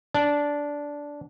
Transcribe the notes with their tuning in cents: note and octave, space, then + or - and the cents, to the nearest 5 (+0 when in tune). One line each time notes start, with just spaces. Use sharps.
D4 -10